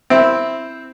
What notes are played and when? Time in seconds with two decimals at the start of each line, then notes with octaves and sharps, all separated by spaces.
0.10 C4 E4